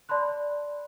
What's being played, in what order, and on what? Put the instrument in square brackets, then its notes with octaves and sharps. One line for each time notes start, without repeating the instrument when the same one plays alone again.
[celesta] D5 A5 B5 C6 F#6